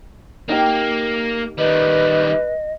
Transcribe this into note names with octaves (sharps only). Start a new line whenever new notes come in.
A#3 D#4 G4
D#3 G3 B4 D#5